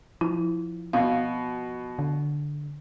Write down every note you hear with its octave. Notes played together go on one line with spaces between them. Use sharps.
F3 E4
B2 F5
D3